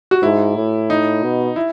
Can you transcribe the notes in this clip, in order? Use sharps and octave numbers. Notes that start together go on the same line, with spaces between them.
F#4
G#2 E4
A2
D#4
B2
E4